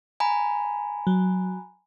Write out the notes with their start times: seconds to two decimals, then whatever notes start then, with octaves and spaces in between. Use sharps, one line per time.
0.20 G#5 A#5 B5
1.07 F#3